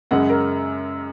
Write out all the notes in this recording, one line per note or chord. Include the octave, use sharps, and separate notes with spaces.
F#2 C#3 G#3 F#5
A#4